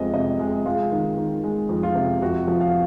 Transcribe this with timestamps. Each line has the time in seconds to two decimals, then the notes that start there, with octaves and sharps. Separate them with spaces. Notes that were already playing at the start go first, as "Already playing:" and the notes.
Already playing: F2 C3 F3 G#3 D#5
0.14 C3 D#5
0.39 G#3
0.66 G#3 F4
0.92 D#3
1.17 D#3
1.44 G#3
1.69 F2
1.83 F4
1.95 C3
2.22 F2 F#4
2.48 F3
2.61 F5